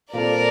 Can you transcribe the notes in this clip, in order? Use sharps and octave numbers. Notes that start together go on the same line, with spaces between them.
A#2 G3 C4 F4 A4 A#4 D5